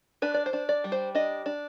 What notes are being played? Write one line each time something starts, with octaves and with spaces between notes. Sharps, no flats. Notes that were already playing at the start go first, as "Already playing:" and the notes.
D4 B4
D5
C5
D4
D5
G3
C5
D4 D#5
D4